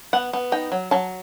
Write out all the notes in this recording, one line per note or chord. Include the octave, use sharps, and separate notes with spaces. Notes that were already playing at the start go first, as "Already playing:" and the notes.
B3 F#5
B3
D#4 G5
F#3
F#3 A5